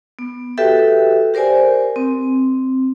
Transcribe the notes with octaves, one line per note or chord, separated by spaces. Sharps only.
B3
F#4 G4 A4 B4 E5 G5
G4 A#4 C5 D5 G#5
C4